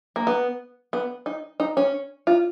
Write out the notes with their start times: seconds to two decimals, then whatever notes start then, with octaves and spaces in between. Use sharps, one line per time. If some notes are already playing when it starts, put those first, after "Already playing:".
0.16 A#3
0.27 B3
0.93 B3
1.26 D#4
1.60 D#4
1.77 C#4
2.27 F4